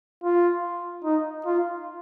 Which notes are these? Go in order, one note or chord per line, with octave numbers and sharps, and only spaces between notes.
F4
D#4
F4